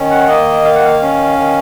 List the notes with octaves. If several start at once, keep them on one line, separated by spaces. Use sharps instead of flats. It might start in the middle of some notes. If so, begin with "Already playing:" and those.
Already playing: D#3 C#4
F#5
A#3 D#5
D#3 F5
F#5
F5
C#4
D#3